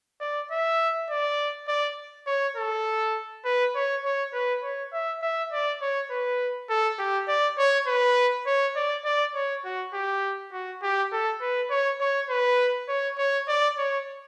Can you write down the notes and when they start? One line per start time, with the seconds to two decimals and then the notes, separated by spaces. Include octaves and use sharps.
0.21 D5
0.51 E5
1.10 D5
1.68 D5
2.27 C#5
2.57 A4
3.45 B4
3.76 C#5
4.04 C#5
4.34 B4
4.63 C#5
4.93 E5
5.23 E5
5.53 D5
5.82 C#5
6.11 B4
6.70 A4
6.99 G4
7.28 D5
7.58 C#5
7.87 B4
8.47 C#5
8.76 D5
9.05 D5
9.35 C#5
9.65 F#4
9.94 G4
10.53 F#4
10.83 G4
11.13 A4
11.41 B4
11.70 C#5
12.01 C#5
12.30 B4
12.89 C#5
13.18 C#5
13.48 D5
13.78 C#5